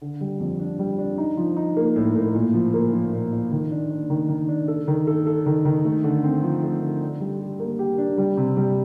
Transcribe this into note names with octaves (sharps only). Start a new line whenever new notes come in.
D3
G3
F2
D4
G3
D4
D#4
F3
D#4
A#3
A2
A2
A#2
F3
A#3
F3
A#2
A#2
D#3
D4
D4
D#3
D#3
D4
A4
D#3
A4
A4
D#3
D#3
A3
D3
C4
F3
A3
D3
D4
G3
G4
A#3
G4
D4
G3
C3
G3